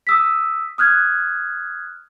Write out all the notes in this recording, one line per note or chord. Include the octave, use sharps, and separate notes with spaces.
D#6 E6 B6
D#6 F6 F#6 G#6